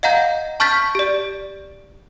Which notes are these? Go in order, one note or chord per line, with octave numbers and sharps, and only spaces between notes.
D#5 F5 F#5 A#5 G6
A5 C#6 F6 G6 A6 B6
G4 D5